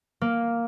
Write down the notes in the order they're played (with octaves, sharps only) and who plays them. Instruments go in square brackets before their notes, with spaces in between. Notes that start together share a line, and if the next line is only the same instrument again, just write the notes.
[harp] A#3